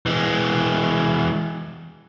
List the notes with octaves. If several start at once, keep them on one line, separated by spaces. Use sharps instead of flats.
E3 G#3